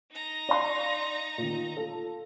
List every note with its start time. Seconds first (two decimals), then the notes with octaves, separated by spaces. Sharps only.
0.12 D#4 A#5
0.49 D5 F5 C6
1.38 A#2 D#3
1.77 F4 A4